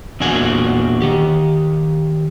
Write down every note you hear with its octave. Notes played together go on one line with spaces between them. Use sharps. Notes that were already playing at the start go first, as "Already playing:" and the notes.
E2 A#2 D4 F#4 G#5
D#3 G4